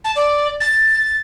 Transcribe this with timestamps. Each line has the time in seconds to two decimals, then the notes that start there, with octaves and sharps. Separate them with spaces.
0.04 A5
0.16 D5
0.60 A6